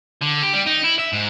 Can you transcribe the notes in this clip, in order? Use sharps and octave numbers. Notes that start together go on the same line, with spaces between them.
D3
G4
G3
D#4
E4
E5
G#2